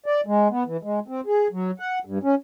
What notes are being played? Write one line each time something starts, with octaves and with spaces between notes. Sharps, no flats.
D5
G#3
B3
E3
G#3
C4
G#4
F#3
F#5
G2
C#4